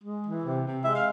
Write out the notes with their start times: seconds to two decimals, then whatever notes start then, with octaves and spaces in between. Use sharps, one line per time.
0.04 G#3
0.25 E3
0.44 C3
0.64 C3
0.85 G#3 E5
0.95 F5